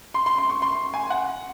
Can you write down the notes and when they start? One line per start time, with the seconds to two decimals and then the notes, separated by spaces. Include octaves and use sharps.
0.14 C6
0.26 C6
0.38 C6
0.50 C#6
0.62 C6
0.94 G#5
1.10 F#5